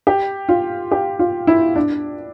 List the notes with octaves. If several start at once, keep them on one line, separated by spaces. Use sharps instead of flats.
G4
F4
G4
F4
E4
D4